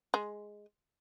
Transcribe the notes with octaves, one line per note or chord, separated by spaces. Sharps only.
G#3